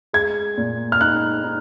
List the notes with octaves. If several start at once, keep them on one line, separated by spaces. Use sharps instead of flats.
G#3 G#6
A#2
F6
D#4 F#6
D#4